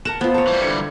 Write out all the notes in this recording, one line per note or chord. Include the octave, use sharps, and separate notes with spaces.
A#4 F#5 A5 E7
B3 F4 C5
A#4 C#5 A5
E3 G3
D3 G#6 C#7